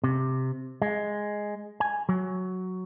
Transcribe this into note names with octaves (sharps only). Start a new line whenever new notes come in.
C3
G#3
G#5
F#3